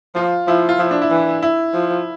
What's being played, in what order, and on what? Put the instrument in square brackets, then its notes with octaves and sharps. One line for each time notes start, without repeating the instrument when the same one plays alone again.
[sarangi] F3 [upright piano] F4
[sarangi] F3 [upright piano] E4
[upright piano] F4
[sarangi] F3 [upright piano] E4
[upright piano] D4
E4
[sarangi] E3
[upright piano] E4
[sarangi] F3